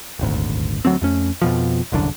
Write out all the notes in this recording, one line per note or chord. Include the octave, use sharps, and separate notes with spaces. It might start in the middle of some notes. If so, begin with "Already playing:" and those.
D#1 G#1 D2
D2 F#3 A3 C4
F2 A3 C#4
F2 B2 F3
E1 C2 F#2 D3